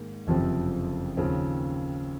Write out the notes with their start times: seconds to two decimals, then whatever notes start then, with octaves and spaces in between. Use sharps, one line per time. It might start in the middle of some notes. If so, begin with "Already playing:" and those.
Already playing: G#2 D#3 A#3 D#4
0.27 F#1 F2 C3 F3 C4
1.17 D#2 C#3 F3 C4